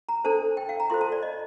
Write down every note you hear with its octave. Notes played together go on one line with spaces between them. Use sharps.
A#5
D4 A4 C5 A5
G5
F5
A#5
F4 A4 C5 C6
A5
D5
D#5